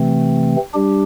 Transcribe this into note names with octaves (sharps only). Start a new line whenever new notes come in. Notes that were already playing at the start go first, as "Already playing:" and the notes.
Already playing: C3 E3 A3 C4
G3 D4 G4